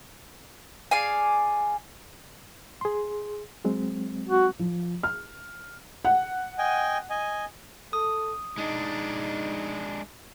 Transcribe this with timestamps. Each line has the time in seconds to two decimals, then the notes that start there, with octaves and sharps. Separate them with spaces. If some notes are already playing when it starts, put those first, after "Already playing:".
0.91 G#4 D5 F5 G#5
2.81 G#4 C6
3.65 F#3 G#3 C4
4.30 F#4
4.59 F3
5.03 F6
6.05 F#5
6.58 D#5 G5 G#5
7.10 D#5 G#5
7.93 A4 D#6
8.58 G#3 D4 D#4